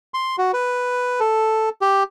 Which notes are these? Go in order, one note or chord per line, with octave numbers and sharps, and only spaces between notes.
C6
F#4
B4
A4
G4